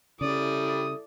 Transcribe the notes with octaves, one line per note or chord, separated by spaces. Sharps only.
C#3 G3 C#4 E4 A4 D5 D#6